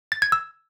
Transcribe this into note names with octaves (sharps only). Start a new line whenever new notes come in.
A6
G#6
E6